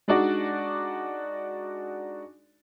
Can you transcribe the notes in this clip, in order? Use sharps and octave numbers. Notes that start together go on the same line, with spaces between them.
G#3 D4 D#4 F#4 D5